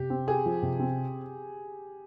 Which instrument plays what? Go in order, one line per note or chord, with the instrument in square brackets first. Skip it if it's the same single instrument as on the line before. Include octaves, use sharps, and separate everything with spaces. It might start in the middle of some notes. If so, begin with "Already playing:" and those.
Already playing: [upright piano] C3 [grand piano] G4
[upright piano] C4
[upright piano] G4 [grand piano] G#4
[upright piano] F3
C3
C4